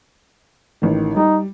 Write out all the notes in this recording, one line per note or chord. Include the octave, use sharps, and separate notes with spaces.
A1 D#3
G3 D#4